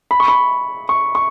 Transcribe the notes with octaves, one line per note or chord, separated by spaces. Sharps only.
B5
C#6
B5
C#6
C#6